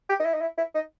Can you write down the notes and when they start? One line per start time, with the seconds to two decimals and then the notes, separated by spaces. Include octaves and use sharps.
0.09 G4
0.20 D#4
0.26 E4
0.34 D#4
0.42 E4
0.58 E4
0.75 D#4